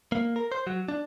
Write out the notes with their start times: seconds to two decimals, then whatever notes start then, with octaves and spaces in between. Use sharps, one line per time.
0.12 A#3
0.36 A#4
0.52 C5
0.67 F#3
0.88 D4